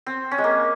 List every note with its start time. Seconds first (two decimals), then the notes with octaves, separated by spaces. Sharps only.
0.07 C4
0.31 C#4
0.38 G#3
0.44 A#3